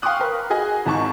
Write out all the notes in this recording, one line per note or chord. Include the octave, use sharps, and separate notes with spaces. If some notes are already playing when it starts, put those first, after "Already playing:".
F5 G5 C6 C#6 D#6 F#6
A#4 B4
F#4 G#4 D#5 G#5
G#1 G#2 A5 C#6